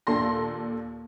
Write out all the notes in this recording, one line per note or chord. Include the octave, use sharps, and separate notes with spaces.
D#2 A#2 D4 A4 C6 A#6